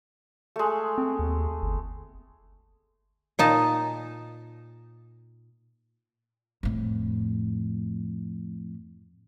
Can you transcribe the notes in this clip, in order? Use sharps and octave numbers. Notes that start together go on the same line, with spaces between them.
G#3 A3
C4
D#2
G1
A#2 D#4 A5
F2 A2